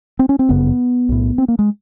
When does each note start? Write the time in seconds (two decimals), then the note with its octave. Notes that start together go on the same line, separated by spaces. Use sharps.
0.19 C4
0.29 C#4
0.39 C4
0.49 G1 F#2 C#3 B3
1.09 B1 A2
1.38 C4
1.48 A#3
1.59 G#3